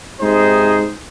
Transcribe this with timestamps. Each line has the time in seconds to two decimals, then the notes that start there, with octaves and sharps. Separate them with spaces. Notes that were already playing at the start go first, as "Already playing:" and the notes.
0.20 G#2 C3 D#4 G#4 C5